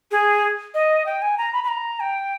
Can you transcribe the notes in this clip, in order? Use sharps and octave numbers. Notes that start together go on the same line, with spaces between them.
G#4
D#5
G5
G#5
A#5
B5
B5
A#5
G5